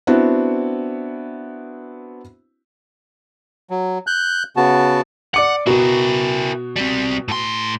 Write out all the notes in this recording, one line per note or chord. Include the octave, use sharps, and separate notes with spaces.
B3 C4 D4 E4 F#4
F#3
F#6 G6
C#3 B3 F#4 A5
D5 F#5 D6 C#7
B2 E4 F#4 A#4
G3 C4
A2 C6